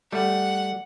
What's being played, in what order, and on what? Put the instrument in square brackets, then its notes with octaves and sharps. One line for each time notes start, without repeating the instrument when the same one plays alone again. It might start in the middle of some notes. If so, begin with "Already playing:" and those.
[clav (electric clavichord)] G3 A3 [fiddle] F#5